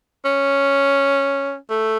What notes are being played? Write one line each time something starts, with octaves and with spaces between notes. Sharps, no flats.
C#4
A3